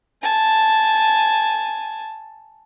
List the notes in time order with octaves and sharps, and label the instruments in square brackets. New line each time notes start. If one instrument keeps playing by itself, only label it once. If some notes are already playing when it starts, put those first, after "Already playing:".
[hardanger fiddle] G#5 A5